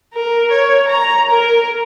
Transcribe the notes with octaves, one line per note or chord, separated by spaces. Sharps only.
A#4
C#5
A#5
A#4